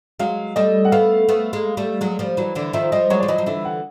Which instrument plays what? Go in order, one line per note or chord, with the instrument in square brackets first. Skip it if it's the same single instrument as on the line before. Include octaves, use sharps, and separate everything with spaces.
[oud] F#3 G#3 [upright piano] F5
[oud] G3 A3 [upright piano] D#5
[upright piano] F#5
[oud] A3 B3 [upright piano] F5
[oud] A3 B3
G#3 A#3
G3 A3
F#3 G#3
F3 G3
E3 F#3
D3 E3
[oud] D#3 F3 [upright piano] E5
[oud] F3 G3 [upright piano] D#5
[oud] F#3 G#3 [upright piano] C#5
[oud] F3 [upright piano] D5
[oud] E3 F#3 [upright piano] D#5
[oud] F3
[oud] D3 E3 [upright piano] E5
[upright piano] F#5